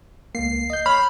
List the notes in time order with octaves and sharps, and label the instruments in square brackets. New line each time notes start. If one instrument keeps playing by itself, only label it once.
[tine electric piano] C#2 A#3 [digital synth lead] C7
[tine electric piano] D#5 G6
[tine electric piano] C#5 F6 [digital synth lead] B5